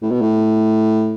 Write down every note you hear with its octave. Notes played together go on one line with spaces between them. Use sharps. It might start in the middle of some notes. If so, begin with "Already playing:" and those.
A2
B2
A2